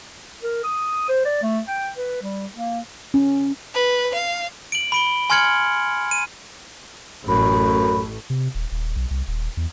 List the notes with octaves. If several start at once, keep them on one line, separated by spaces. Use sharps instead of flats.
A#4
D#6
C5
D5
A3
G5
B4
G3
A#3
C#4
B4
F5
D7 F#7
B5 D7 G7
G#5 C6 F6 G#6 C#7 F#7
D#7
A1 F#2 A3 B5
C3
D#1
D#1
B1
C2
D#1
E2